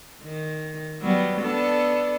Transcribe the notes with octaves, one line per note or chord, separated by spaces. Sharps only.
D#3
F#3 G3 B3
B3 D4 A4